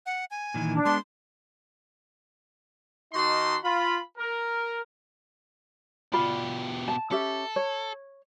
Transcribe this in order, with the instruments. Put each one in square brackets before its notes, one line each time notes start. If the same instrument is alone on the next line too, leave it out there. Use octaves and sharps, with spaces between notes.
[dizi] F#5
G#5
[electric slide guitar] A#2 D#3 E3
[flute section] D4
[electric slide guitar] G#3 B3 [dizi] C6
[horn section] D#3 D#4 F#4 A5 C6
F4 B5
A#4
[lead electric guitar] B2 G4 [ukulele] F4 D5 B5
[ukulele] A5
[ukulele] C#4 G4 E5 [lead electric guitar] A4
[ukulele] C#5